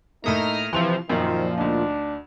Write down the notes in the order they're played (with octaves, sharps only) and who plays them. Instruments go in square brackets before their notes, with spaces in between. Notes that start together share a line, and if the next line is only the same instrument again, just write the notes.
[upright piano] A2 A3 A#3 [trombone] D#4 [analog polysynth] A#5 D#6 F6
[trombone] C3 [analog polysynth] E3 F3 [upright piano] C6 F7
[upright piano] F#2 [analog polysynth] A#2 F3 [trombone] D#3
[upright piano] D2 D#4 [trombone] D4